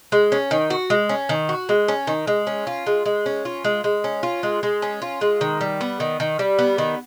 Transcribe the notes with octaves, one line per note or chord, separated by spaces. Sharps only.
G#3
C#4
D#3
F#4
G#3
C#4
D#3
F#4
G#3
C#4
D#3
G#3
C#4
F4
G#3
G#3
C#4
F4
G#3
G#3
C#4
F4
G#3
G#3
C#4
F4
G#3
D#3
G3
B3
D#3
D#3
G3
B3
D#3